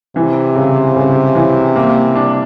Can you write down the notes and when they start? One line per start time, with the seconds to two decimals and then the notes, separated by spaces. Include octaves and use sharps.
0.16 C3 E3
0.55 C#3
0.96 C#3
1.35 E3
1.76 A#3
2.15 D4